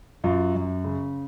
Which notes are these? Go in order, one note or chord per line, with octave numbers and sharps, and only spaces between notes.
F#2 F4
F#2
C#3